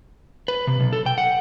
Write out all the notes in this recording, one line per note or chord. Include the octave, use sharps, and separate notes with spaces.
B4
C3
B1
A4
G5
F#5